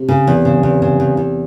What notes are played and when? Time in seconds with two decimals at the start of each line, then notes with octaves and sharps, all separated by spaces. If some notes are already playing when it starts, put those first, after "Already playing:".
Already playing: C3
0.09 C#3
0.27 E2
0.45 C#3
0.63 E2
0.82 C#3
1.00 E2
1.17 E2